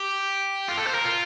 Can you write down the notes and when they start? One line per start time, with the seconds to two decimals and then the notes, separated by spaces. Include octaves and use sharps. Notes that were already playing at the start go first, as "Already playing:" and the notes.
Already playing: G4
0.68 F4
0.77 A4
0.87 C5
0.95 A#4
1.04 F4